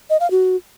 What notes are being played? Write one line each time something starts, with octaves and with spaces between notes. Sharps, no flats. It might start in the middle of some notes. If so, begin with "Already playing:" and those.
D#5
F5
F#4